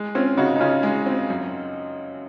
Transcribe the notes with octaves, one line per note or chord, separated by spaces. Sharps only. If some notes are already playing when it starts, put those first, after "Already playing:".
Already playing: G#3
C4 C#4 F4
C#3 D#4 F#4
D#4
C#3 C#4 F4
G#3
C4
F#2